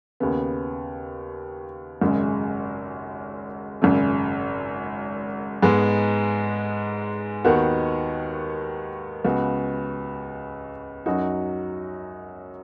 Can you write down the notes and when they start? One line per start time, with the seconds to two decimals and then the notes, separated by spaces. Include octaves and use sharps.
0.20 D#2 C#3 B3
2.02 G#1 F#2 C#3 G#3
3.82 G#1 F#2 C#3
5.63 G#2 G#3 B3
7.44 D#2 D#3 B3 F#4
9.24 C#2 C#3 B3 F#4
11.06 F#2 F#3 D#4 F#4